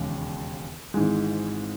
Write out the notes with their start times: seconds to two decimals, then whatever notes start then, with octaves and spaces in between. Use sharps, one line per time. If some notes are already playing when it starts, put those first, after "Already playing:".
Already playing: E1 D#2 C#3 G#3
0.94 G#1 G#2 E3 G#3